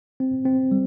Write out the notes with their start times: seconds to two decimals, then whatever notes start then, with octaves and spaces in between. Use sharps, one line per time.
0.20 C4
0.45 C4
0.71 G3